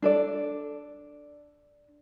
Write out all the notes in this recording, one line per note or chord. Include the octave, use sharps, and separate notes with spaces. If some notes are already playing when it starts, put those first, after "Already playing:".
D4 A4 D5